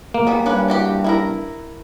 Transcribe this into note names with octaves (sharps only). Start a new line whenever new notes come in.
A#3
G3 B3 G#4
G2 C#4 D4 B4
E3 F#4 G4
E4 F4 A#4